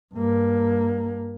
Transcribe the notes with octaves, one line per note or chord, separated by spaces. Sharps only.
G2 A#3